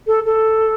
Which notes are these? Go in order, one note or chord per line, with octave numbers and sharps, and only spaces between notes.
A4
A4